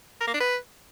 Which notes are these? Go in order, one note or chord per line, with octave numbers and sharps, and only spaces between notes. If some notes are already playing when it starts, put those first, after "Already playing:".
A#4
A#3
D4
B4